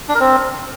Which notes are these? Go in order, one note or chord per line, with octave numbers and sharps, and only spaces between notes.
D4
A#4
C4